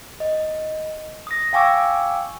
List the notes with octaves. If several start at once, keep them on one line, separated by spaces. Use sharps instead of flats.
D#5
D#6 A#6
F5 G5 G#5 C#6 D6 E6